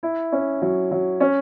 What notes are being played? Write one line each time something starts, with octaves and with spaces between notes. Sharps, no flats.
E4
C#4
F#3
F#3
C#4